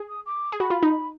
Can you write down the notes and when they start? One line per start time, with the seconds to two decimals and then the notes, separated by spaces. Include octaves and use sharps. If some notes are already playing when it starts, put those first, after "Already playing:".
Already playing: G#4
0.08 D#6
0.26 D6
0.52 G#4
0.60 F#4 B5
0.70 F4
0.83 D#4